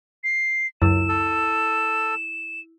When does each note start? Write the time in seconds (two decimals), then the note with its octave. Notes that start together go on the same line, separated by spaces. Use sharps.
0.24 C7
0.82 C#2 F#2 E4 E6 E7
1.09 A4